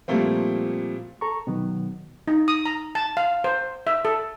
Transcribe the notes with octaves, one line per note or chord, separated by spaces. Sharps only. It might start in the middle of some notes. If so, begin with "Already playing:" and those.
A#2 F3 G3 A3 A#3 C4
A4 A#5 C#6
B2 D#3 F#3 B3
D#4
D#6
A#5
A5
F5
C5
E5
A4